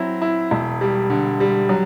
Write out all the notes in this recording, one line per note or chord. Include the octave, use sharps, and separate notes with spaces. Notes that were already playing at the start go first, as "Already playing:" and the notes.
Already playing: F#3 C4 E4
E4
E1
G3
D3
G3
F#3